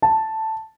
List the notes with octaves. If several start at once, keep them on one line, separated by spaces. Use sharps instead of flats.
A5